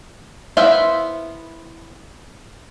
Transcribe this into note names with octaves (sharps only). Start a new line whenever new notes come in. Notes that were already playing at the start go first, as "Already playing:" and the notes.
B3 E4 C5 E5 F5